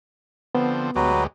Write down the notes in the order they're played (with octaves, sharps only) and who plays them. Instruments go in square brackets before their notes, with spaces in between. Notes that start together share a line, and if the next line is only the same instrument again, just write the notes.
[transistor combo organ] D3 F3 C4 [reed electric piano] B3
[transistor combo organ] D2 G#3 G4 [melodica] F#3 F#4 B4